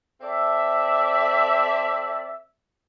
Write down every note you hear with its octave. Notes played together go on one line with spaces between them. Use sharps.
C4 A4 D5 E5